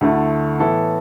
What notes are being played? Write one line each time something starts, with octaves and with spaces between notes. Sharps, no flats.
D2 D3 A3 E4
A2 E3 B3 E4 A4